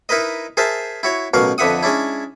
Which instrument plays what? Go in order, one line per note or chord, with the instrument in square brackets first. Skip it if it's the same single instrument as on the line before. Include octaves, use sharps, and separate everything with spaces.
[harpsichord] D#4 E4 A#4 B4 D#5
G#4 A#4 C5 E5 A5
E4 F#4 C#5
A1 B2 F#3 A#4 F5
F2 D3 B4 E5 F#5 D#6
G#3 C#4 D4 E4